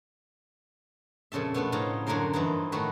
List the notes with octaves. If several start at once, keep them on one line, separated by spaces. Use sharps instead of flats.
F2 A#2 C#3 A4 E5
B2 A3 B3 D4 A4
A2 C#3 F3 D#4 F4
F#2 D3 F#3 A#3 A#4 C5
G2 E3 F3 D#4 E4
A2 D#3 A3 F#4 B4